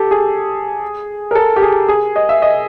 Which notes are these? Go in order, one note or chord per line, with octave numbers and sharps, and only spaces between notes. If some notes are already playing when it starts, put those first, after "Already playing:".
Already playing: G4 A4
G#4
A#4
A4
G4
G#4
G#4
D#5
E5
D#5